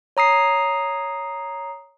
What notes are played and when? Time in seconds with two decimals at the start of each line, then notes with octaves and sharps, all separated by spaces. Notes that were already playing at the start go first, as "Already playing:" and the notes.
0.17 C#5 A#5 D#6 C7